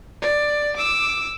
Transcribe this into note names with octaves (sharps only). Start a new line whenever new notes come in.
D5
D6 E6